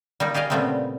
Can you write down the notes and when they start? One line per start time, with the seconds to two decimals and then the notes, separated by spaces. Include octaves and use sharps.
0.20 G3 A#3 D#4
0.34 G4 G#4 D5 D#5 F5
0.50 A#2 C#3 G3 A3 B3 C4